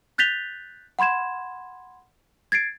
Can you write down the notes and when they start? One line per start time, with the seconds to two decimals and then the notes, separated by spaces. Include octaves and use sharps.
0.18 F#6 G6 A6 B6 F7 G7
0.99 F#5 B5 C6 G#6 E7
2.52 G#6 A6 C7 D7